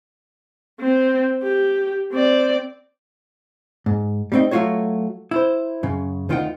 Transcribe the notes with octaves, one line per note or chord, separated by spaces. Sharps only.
C4
G4
C4 D5
G#2
G3 A3 C4 D#4 G5
F#3 A3 C4 F4 F#4 C#5
E4 C5
F#2 C#3
D2 D#3 F4 F#5 G5